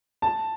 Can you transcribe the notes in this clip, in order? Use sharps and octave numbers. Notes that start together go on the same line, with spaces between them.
A5